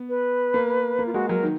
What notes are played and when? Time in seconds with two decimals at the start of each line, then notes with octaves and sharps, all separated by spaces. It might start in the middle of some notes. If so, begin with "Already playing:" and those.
Already playing: B3
0.09 B4
0.54 A#3
0.99 A#3
1.06 F4
1.13 G#3 F#4
1.29 F#3 A#4
1.43 D#3